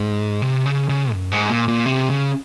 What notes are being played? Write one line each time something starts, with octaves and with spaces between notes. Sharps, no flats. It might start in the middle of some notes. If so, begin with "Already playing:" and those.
Already playing: G#2
C3
C#3
C#3
F#2
G#2
A#2
A#2
C3
C#3